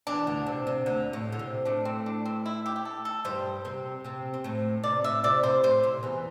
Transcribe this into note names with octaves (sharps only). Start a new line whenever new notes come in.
E2 E3 D4
D2 D3
C3
C3
D2 D3
A2
D3
C3
A2 A3 D4
C4
D4
C4
E4
G4
G4
A4
A4
G2 G3 C5
C3 C4
C3 C4
C4
A2 A3
C3 D5
A2 E5
C3 D5
C3 C5
A2 C5
C3
E2 E3